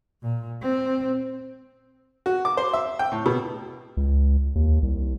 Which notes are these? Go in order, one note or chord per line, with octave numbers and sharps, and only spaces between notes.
A#2
C4
F#4
D6
C5
E5
G5
A2
B2
C#2
D#2
C2